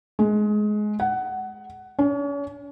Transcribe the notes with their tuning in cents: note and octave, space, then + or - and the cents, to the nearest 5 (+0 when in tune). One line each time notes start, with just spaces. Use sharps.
G#3 +20
F#5 +15
C#4 +40